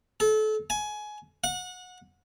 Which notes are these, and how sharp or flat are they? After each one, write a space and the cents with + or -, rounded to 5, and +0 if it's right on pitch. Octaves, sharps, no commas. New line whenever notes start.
A4 -30
G#5 +20
F#5 -25